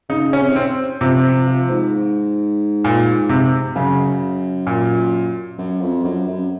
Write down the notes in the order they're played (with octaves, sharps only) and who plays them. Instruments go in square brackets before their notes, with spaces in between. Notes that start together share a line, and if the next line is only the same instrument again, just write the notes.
[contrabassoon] C#3 [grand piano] D#4
[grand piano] C#4
[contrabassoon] C3
[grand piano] C4
[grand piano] C3 [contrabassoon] F3
[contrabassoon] F3
F3
G#2
[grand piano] A#2
C3
[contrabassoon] F#2 [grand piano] C#3
[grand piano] A#2
[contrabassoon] F#2
F2
F#2
F#2